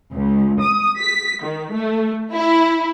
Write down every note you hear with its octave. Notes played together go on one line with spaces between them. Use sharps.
C#2
D#6
B6
D#3
A3
E4